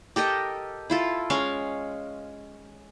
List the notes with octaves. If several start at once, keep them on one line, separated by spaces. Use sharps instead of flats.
G4 A4 A#4 D#5
E4 F4 A4
G#3 C#4 F5 C#6